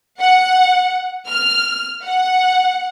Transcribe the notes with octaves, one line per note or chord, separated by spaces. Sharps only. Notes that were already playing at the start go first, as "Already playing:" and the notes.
F#5
F6
F#5